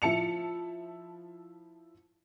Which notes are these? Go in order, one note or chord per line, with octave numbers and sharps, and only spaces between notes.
F3 E4 A5 C#7 F7